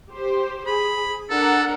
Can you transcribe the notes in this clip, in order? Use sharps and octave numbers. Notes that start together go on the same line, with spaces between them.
G4 C5
G#4 B5
D4 A4 A#4 F#5